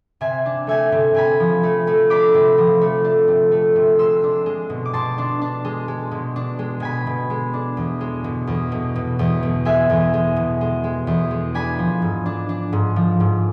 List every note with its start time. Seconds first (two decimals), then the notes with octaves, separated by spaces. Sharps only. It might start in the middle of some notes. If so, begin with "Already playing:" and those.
0.21 C3 E5 G#5
0.46 D4
0.67 A3 E5 G#5
0.92 C3
1.15 C3 G#5 B5
1.40 F3
1.63 A3
1.87 A3
2.10 D4 B5 D6
2.34 C3
2.58 F3
2.81 A3
3.04 D4
3.28 C3
3.51 A3
3.76 C3
3.99 G#3 C6 E6
4.23 D4
4.46 G#3
4.70 B2
4.85 D6
4.93 B2 A5 C6
5.18 D4
5.41 D4
5.65 G#3
5.88 G#3
6.11 B2
6.36 D4
6.59 G#3
6.80 B2 G#5 B5
7.07 B2
7.30 G#3
7.53 D4
7.77 E2
8.01 G#3
8.24 B2
8.47 E2
8.72 B2
8.96 B2
9.19 E2
9.43 B2
9.65 G#3 E5 G#5
9.90 E2
10.14 G#3
10.36 B2
10.61 G#3
10.84 G#3
11.07 E2
11.31 G#3
11.54 D4 G#5 B5
11.79 F3
12.02 G#2
12.26 D4
12.49 D4
12.72 G#2
12.96 F3
13.20 G#2